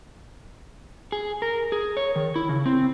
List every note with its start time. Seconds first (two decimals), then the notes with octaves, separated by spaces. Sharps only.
1.12 G#4
1.42 A#4
1.72 G#4
1.97 C#5
2.16 D#3
2.36 E4
2.49 C#3
2.66 C4